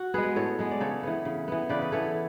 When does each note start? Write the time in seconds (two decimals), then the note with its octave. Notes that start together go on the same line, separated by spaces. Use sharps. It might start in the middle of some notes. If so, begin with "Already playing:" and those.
Already playing: F#4
0.14 G#3 B3 G#4 B4
0.36 A2 A4 C#5
0.59 G#3 B3
0.71 D5
0.80 C#3 A4 C#5
1.03 E3 B3
1.25 C#3
1.48 E3 B3
1.69 C#3 B4 D5
1.82 B4
1.92 E3 B3 A4 C#5